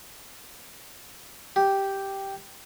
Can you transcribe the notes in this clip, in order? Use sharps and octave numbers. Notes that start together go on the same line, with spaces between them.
G4